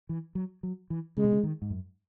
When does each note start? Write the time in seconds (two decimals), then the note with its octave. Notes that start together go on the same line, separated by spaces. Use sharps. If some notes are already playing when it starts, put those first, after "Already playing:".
0.09 E3
0.35 F#3
0.63 F#3
0.90 E3
1.17 C#3 G#3
1.24 B2
1.32 C#3
1.43 D#3
1.62 G#2
1.70 F#2